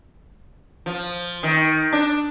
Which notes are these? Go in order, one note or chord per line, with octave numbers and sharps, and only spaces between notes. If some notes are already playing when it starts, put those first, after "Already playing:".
F3
D#3
D4